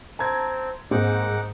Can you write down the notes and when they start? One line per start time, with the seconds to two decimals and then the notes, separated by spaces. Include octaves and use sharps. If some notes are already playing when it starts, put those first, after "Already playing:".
0.19 C4 A5 A#5 G#6
0.91 G#2 G#3 A#3 C4 D#4 F#5 D6